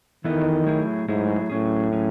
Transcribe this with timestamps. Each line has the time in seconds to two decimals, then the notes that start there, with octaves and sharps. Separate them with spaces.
0.24 D#3 E3 B3 E4 A4 D#5
0.66 F#3 A3 E4 G#4
1.08 G#2 F#3 A3 E4 G#4
1.50 A2 F#3 C#4 G#4
1.92 F#3 C#4 G#4